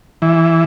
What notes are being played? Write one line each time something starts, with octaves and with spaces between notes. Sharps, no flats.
E3